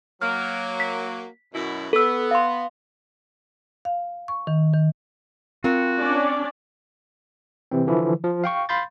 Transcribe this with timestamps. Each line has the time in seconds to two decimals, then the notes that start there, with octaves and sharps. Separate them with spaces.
0.22 F#3 A#3 F6
0.80 B6
1.54 F#2 B2 E4
1.93 B3 A4 E6
2.31 F5 C6
3.85 F5
4.28 C#6
4.47 D#3
4.73 D#3
5.64 C4 F4 F#4 A#4
6.00 C#4 D4 D5
7.71 C3 E3 C4
7.87 D3 E3 F3 E4
8.24 F3
8.44 F5 G5 C#6
8.69 F5 B5 C6 G6 A6